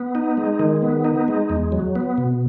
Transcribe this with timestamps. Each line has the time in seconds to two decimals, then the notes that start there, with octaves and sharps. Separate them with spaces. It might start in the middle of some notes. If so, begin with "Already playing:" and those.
Already playing: B3
0.15 D#4
0.37 G#3
0.59 D#3
0.82 B3
1.05 D#4
1.28 G#3
1.50 E2
1.72 F#3
1.96 B3
2.18 B2